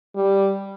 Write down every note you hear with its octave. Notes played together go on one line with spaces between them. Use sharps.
G3